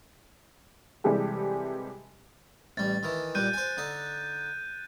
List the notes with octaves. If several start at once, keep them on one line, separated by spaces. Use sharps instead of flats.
C3 E3 G3 G#3 G4 A4
A1 G3 A6
D#3 E3
A#2 G3 F#6 G6 D#7
C5 G#5
D3 D#4